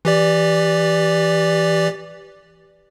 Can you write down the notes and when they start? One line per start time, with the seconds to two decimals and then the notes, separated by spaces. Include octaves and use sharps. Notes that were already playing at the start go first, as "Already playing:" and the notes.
0.05 E3 G4 D5